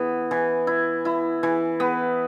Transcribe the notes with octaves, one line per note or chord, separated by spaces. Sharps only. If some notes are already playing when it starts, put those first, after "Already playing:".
Already playing: E3 B3
E3
E4
E4
E3
B3